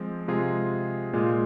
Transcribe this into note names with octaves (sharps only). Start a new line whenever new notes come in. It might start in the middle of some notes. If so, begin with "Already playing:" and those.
Already playing: F3 G#3 C4
C3 G#3 F4 G#4
A#2 G#3 F4